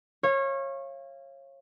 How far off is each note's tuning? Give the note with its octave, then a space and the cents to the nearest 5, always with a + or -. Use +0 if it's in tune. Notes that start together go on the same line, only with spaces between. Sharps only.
C#5 -25 F5 -25